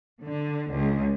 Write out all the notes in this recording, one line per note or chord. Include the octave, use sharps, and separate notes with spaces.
D3
C#2